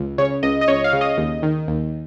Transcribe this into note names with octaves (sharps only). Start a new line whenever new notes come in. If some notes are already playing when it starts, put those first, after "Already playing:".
Already playing: C#2
C#3 C#5
C#2 D#5
D#5
C#2 C#5
F5
C#3
D#5
D#2
D#3
D#2